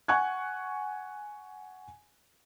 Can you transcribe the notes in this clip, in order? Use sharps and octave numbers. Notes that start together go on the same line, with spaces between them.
F#5 G#5 C#6 F#6 G#6